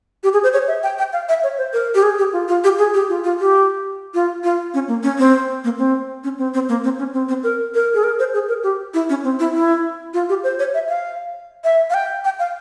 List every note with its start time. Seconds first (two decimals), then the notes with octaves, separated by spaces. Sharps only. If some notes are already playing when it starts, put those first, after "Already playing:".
0.24 G4
0.33 G#4
0.43 C5
0.53 C#5
0.68 E5
0.83 G5
0.99 G5
1.13 F5
1.29 E5
1.43 C#5
1.58 C5
1.73 A#4
1.95 G4
2.03 G#4
2.18 G4
2.33 F4
2.48 F4
2.64 G4
2.78 G#4
2.94 G4
3.09 F4
3.24 F4
3.39 G4
4.14 F4
4.44 F4
4.74 C#4
4.88 A#3
5.03 C#4
5.18 C4
5.64 A#3
5.78 C4
6.24 C#4
6.38 C4
6.54 C4
6.69 A#3
6.84 C4
6.99 C#4
7.13 C4
7.29 C4
7.43 A#4
7.74 A#4
7.94 G#4
8.04 A#4
8.19 C5
8.34 G#4
8.49 A#4
8.63 G4
8.94 E4
9.10 C#4
9.24 C4
9.39 E4
9.54 E4
10.14 F4
10.29 G4
10.44 C5
10.59 C#5
10.74 E5
10.89 F5
11.64 E5
11.90 F5
11.94 G5
12.25 G5
12.39 F5